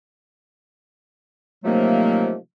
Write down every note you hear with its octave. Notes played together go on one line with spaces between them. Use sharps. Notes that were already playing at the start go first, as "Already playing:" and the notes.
C3 D#3 F3 F#3 A3 A#3